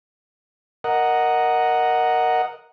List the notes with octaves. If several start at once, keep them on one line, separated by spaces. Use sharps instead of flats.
A#4 D#5 F#5